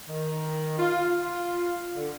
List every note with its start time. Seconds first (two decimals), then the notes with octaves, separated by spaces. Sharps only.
0.08 D#3
0.78 F4
1.03 F4
1.94 D3